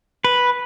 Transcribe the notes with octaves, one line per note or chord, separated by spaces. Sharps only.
B4